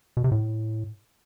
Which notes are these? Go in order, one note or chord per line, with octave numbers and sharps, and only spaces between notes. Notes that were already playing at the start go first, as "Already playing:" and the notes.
B2
C3
A2